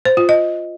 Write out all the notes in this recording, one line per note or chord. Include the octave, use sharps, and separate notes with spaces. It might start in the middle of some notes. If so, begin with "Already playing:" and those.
C5
F4
D#5